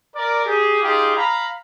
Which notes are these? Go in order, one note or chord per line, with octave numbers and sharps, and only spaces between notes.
A#4 D5
G4 G#4
D#4 F4 G4 G#4
F5 A#5 B5